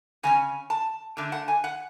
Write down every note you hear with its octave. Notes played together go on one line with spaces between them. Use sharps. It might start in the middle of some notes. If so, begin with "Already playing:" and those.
C#3 G#3 C#4 G#5
A5
D3 A3 D4
F#5
G#5
F#5